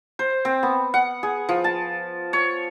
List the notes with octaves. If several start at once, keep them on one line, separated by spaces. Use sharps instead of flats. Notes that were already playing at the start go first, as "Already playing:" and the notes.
C5
C4
B3
F#5
G#4
F3
A5
C#5